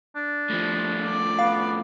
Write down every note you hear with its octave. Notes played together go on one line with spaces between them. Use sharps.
D4
A2 F3
D5
B3 F5